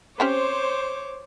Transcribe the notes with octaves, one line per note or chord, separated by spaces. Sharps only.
C4 C#4 G4 C5 C#5 D6